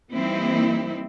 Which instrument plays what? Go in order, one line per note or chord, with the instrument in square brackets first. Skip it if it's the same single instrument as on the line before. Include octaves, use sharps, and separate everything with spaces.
[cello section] E3 G3 A#3 C4 D#4 E4